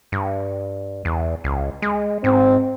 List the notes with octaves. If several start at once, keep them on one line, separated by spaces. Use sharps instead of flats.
G2
E2
C#2
G#3
G#2 C4